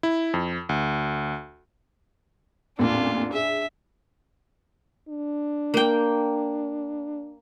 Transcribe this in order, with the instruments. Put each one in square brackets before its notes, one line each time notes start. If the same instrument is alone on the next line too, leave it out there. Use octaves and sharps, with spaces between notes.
[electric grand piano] E4
F2
D2
[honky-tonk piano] A1 F2 A#2 [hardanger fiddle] D4 F4
[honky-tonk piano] G#4 [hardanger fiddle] E5
[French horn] D4
[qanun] A#3 G5